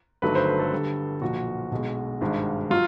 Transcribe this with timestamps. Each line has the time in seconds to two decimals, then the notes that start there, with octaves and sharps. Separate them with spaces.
0.22 G1 G2 D#3 F#3 A3 B4
0.35 C5
0.47 B4
0.60 A4
0.72 G1 G2 D3 G3
1.22 B1 A#2 F3 F#4
1.72 B1 B2 G#3
2.21 G#1 G2 D#3 G#3
2.70 F#3 F4